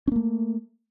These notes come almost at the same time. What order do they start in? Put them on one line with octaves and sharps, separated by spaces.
C#4 A#3 A3